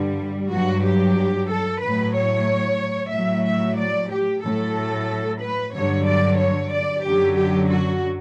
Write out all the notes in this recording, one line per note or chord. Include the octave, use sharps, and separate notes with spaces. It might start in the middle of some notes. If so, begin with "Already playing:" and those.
Already playing: G2 D3 G3
G2 F#3 F#4
G4
A4
A2 F#3 B4
C#5
A2 F#3 E5
E5
D5
G4
A2 F#3 A4
B4
G2 D3 F#3 C#5
D5
C#5
D5
F#2 D3 F#3 G4
G4
F#4